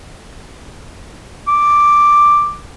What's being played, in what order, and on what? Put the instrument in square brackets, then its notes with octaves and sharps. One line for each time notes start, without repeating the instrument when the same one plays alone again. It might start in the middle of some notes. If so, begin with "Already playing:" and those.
[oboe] D6